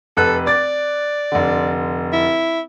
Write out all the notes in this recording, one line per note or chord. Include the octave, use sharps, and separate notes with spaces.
F1 A4 B4 F#6
D5 D6 A6
F1 D3
E4